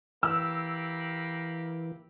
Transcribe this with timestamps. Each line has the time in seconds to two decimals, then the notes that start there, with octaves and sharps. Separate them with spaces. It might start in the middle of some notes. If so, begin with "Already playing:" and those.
0.23 E3 A#3 G4 B5 E6